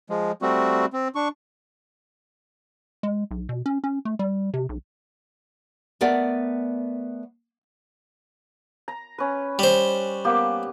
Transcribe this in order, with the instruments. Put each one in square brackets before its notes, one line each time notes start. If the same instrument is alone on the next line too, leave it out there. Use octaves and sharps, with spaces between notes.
[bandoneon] F3 G#3
G3 A3 C4 F#4
C4
D4 C#6
[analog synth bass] G#3
B1
B2
C#4
C#4
A3
G3
C3
B1
[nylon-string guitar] A3 B3 A#4 D5 F#5
[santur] A#5
C#4 B4
[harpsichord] G3 C5
[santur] A#3 B3 G4